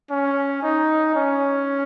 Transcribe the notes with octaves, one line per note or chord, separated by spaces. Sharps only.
C#4
D#4
C#4